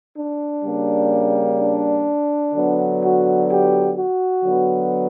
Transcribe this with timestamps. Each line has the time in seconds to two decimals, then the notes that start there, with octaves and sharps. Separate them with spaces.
0.16 D4
0.63 C#3 G3 A#3
1.58 D4
2.53 D3 F#3 B3
3.01 F#4
3.48 G4
3.96 F#4
4.43 D3 F#3 B3